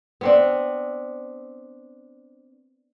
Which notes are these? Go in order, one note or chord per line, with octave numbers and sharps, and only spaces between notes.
B3 C4 D4